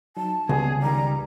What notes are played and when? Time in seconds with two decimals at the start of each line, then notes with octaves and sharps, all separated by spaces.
0.17 F#3 D#4 A5
0.49 C#2 C3 G3 B3 G#4
0.82 D#3 G3 D5 A#5